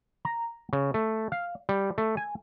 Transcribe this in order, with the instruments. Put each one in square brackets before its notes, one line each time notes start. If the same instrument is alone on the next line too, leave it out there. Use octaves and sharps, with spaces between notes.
[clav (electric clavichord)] A#5
C#3
A3
F5
G3
A3
G#5